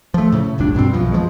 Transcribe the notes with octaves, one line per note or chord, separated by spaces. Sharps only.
F3 A3
A2 C#3
D1 A#1 G2 D4
G2 B2 G3 C4
B1 F#2 B2 F3
F3 G#3